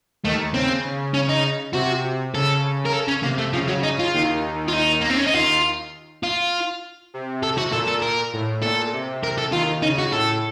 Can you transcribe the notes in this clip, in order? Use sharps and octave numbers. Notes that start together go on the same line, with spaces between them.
D#2 D#3 A3
C#3 C4
C#3
C#4
D#4
C3 F#4
C#3 A4
A#4
A4
C#4
C3 A#3
A3
C#3 F3
F#3
D#4
F4
D#2 D#3
F4
D#4
A#3
C4
C#4
D#4
D#2 D#3 F4
F4
C3
A4
F#4
A#2 A4
A4
A#4
A2
A#2 A4
C3
A#4
A4
D#2 D#3 F4
C#3 D#4
F#4
A2 A4